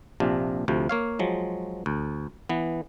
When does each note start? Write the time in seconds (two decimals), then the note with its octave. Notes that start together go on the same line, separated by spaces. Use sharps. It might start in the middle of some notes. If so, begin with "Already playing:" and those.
0.20 A#1 C3 D4 F4
0.68 D2 C3 F3
0.89 A#3 C#5 F5
1.19 F3 F#3 G#3
1.86 D2
2.49 E3 B3